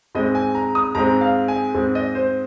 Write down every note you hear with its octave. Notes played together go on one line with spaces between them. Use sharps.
G#2 G#3 C4 D#5
G#5
A#5
D#6
G#2 G#3 C4 A#5
F5
G#5
G#2 G#3 C4
D#5
C5